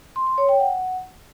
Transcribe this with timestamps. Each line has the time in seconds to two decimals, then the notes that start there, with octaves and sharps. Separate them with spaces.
0.16 C6
0.27 C6
0.38 C#5
0.49 G5
0.60 F#5